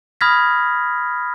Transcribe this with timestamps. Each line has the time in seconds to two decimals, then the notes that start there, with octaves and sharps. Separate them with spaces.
0.21 B5 D#6 F6 G#6 A#6 B6